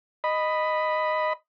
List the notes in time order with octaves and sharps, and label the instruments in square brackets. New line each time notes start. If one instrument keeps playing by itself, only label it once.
[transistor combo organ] D#5 B5